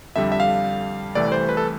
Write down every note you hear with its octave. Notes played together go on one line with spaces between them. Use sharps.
F2 D3 G3 E5
E5
F5
C2 C3 E3 A3 D5
C5
B4
A4